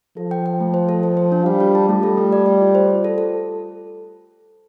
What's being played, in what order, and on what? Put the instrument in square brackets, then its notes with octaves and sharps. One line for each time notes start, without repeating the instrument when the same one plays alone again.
[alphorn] F3 [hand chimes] A4
[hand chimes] G5
G5
A3
C5
A4
C5
C5
D4
[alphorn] G3 [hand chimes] F5
[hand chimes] F4
A5
[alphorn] G3 [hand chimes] A3
[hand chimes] A4
A3
D5
D5
F4
C5
F4
A4
A4